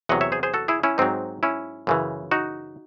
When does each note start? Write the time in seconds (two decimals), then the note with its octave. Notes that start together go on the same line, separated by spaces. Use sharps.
0.09 E2 C3 F#3 D#5 F#5
0.21 C#5 E5
0.32 G#4 C5
0.43 G#4 C5
0.54 F#4 A4
0.68 E4 G#4
0.83 C#4 E4
0.98 G#2 F#3 C4 D#4
1.43 C#4 E4
1.87 F#2 C#3 E3
2.31 D#4 F#4